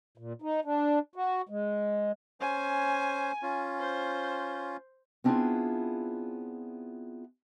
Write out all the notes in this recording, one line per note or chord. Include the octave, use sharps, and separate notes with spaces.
A#2
D#4
D4
F#4
G#3
C#4 C5 G#5
C#4 F4
C5
B3 C4 D4 E4 F4 G#4